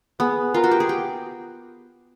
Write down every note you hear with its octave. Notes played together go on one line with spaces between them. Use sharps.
B3 G#4
F4 A#4
F#4
G4
G#4
G4